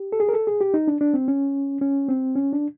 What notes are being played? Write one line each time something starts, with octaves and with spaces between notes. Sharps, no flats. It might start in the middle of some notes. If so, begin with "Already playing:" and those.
Already playing: G4
A4
G#4
A#4
A4
G#4
G4
D#4
D4
D4
C4
C#4
C#4
C4
C#4
D4